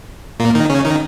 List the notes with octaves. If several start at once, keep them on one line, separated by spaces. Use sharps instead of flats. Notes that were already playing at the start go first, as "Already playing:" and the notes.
A#2 A#3
D#3 D#4
C#3 C#4
D#3 D#4